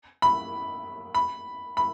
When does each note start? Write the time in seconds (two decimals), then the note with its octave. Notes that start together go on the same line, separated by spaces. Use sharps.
0.22 B5
1.15 B5
1.77 B5